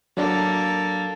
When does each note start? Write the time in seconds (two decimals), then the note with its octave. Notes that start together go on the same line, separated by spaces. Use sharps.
0.17 F#3 A#3 D4 A4